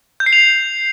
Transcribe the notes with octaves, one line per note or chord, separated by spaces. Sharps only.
G6
C7
F7